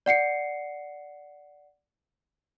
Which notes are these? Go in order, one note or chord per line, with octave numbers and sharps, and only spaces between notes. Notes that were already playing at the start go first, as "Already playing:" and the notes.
D5 F#5 C7 C#7